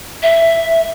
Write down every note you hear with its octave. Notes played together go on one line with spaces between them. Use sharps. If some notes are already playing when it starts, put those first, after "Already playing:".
E5